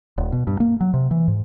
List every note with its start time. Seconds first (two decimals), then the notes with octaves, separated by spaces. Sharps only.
0.18 D#1
0.32 B2
0.47 G2
0.60 A#3
0.81 F#3
0.94 C3
1.11 E3
1.28 G#2